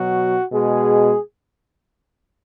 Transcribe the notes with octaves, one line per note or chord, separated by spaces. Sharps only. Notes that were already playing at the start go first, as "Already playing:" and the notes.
Already playing: B2 F#3 F#4
B2 G#3 G#4